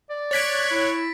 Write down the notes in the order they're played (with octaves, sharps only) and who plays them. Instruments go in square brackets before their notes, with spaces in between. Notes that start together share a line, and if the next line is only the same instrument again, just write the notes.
[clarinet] D5
[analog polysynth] C#5 F#6 G#6 [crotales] A6 B6 D7
[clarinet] E4